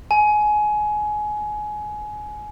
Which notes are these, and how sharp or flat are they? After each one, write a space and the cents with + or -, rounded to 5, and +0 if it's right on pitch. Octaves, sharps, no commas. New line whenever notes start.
G#5 +20